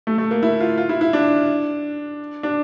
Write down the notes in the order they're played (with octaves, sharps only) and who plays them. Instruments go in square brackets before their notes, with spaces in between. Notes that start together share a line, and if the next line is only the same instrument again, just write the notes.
[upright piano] A3
A3
A#3
E4
F4
F4
E4
E4
D4
D4